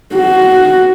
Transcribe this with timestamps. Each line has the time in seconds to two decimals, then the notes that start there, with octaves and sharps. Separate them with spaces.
0.15 F#4